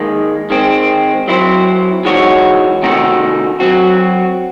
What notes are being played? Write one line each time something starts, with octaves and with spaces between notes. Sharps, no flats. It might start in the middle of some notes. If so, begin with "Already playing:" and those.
Already playing: D#2 D#3 G#3
D#3 G#3 C4
F#3 C4 E4 C5
E3 G#3 D#4 F#4 C#5
C3 D#3 A3 D#4 F#4
F#3 C4 F#4